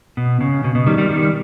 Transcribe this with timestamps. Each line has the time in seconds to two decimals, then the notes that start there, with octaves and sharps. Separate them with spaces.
0.17 B2
0.41 C#3
0.64 B2
0.75 B2
0.87 D#3 G3
0.98 D#3 G3
1.09 D#3 G3